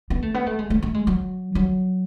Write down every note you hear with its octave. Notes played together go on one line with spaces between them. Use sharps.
B3
A3
B3
A3
G#3
A3
A3
G#3
F#3
F#3